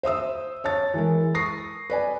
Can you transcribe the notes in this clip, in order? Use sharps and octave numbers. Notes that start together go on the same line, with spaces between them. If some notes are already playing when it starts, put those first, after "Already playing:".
C5 E5 D#6 E6
C#5 A5 A6
E3 G#3 A#4
C#6 D#6 A#6 C7
B4 D5 G#5